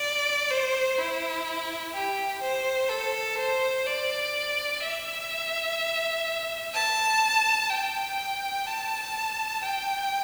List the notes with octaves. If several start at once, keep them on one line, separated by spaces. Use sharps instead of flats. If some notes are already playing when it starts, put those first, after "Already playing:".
Already playing: D5
C5
E4
G4
C5
A4
C5
D5
E5
A5
G5
A5
G5